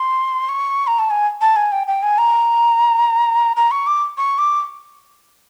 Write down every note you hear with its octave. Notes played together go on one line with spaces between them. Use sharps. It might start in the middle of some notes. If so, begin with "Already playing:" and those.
Already playing: C6
C#6
A#5
A5
G#5
A5
G#5
G5
G5
G#5
A#5
A#5
C#6
D6
C#6
D6